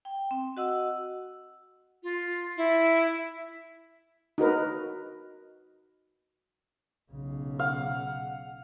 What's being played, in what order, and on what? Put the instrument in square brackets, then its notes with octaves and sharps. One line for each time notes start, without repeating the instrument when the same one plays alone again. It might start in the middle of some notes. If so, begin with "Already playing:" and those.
[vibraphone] G5
C4
F#4 D#5 F#5 E6
[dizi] F4
E4
[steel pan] D#4 F#4 A#4 B4
[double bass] B1 C#3
[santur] F5 [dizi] F#5